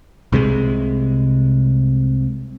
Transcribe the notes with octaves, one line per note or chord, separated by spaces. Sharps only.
C2 C3 G3 G#3